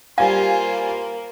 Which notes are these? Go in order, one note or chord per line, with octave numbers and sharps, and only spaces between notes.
G3 A#3 F4 C5 F5 G#5